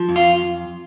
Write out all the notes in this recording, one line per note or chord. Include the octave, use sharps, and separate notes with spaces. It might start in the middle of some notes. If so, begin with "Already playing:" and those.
Already playing: F3
F2
F4